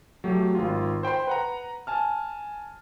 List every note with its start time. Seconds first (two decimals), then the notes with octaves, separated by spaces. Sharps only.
0.24 F#3 A3 G4
0.55 G#1 F4
1.03 C5 G5 B5 C6
1.27 B4 F#5 A#5
1.87 G#5 A5 F6